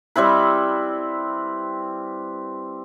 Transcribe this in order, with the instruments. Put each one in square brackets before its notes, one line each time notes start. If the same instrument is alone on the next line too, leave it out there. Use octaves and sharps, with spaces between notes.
[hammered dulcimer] G3 C4 E4 B4